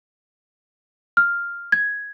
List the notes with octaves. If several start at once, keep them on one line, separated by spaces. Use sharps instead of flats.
F6
G#6